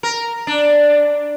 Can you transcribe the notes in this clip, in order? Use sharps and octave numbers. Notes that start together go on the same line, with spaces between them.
A#4
D4